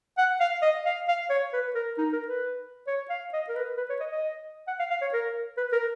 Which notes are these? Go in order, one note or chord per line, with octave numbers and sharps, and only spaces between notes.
F#5
F5
D#5
F5
F5
C#5
B4
A#4
D#4
A#4
B4
C#5
F5
D#5
A#4
B4
B4
C#5
D#5
D#5
F#5
F5
F5
C#5
A#4
B4
A#4